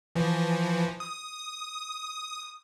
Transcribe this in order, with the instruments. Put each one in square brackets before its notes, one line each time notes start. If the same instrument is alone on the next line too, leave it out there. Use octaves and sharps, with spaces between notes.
[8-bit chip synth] E3 F3
D#6